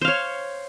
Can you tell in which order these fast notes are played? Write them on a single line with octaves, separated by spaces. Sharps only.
C5 F5 C#5